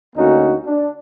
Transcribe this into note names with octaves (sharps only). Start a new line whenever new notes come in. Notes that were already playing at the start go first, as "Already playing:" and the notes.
D2 D3 A#3 C#4 D#4 F#4
D4